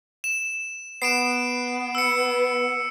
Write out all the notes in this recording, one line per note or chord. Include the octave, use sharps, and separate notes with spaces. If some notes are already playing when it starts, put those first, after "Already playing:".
E7
B3 C7 D7 E7
E6 C#7